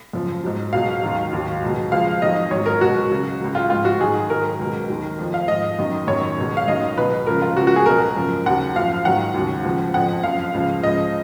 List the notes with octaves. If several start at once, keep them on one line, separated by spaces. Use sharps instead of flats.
F#2 C#3 F3
G#2 F#3
C#2 B2 F#3 F5
D#2 D#3 F#3
D#2 D#3 F#3
C#2 B2 F#3
C#2 C#3 F3 F5
F2 D#3 F#3 D#5
G#2 F#3 C#5
A#4
C#2 B2 F#3 F#4
C#2 C#3 F#3
C#2 C#3 F#3
F4
G#2 F3 F4
F#4
G#2 D#3 F#3 G#4
G#2 D#3 F#3 A#4
C#2 B2 F#3
D#2 D#3 F#3
F2 F3
F5
G#2 F3 D#5
F#2 D#3 F#3
F#2 D#3 F#3 C#5
C#2 B2 F#3
F5
F#2 D#3 F#3 D#5
C#2 B2 F#3 B4
C#2 C#3 F3 A#4
F4
C#2 C#3 F3 F#4
F#4
G#4
C#2 B2 F#3 A#4
F#2 C#3 F3
D#2 C#3 F#3 F#5
F#2 F3 F5
G#2 D#3 F#3 F#5
D#2 C#3 F#3
C#2 C#3 F3
F2 C#3 F3 F#5
F#2 F3 F5
C#2 C#3 F3
C#2 C#3 F3 D#5